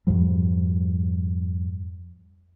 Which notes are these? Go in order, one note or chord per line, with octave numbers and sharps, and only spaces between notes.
F2 G#2 F3 G3